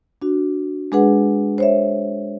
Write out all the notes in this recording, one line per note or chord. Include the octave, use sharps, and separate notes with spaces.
D4 F#4
G#3 D4 G#4 B4 F#5
C5 C#5 E5